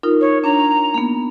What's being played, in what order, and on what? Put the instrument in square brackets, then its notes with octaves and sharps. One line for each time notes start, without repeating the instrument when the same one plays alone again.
[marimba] D#4 F4 A#4
[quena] C#5
[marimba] D4 [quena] A#5
[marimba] A#3 B3